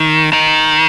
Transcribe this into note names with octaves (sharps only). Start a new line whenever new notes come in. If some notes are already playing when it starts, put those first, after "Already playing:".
Already playing: D#3
D#3